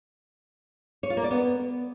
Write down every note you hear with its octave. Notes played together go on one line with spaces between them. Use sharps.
C#5
F4
A#3
D5
B3